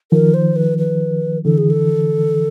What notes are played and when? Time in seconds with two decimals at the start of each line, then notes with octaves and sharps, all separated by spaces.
0.12 D#3 F3 A#4
0.34 C5
0.56 B4
0.78 B4
1.44 D3 E3 A4
1.58 G#4
1.70 A4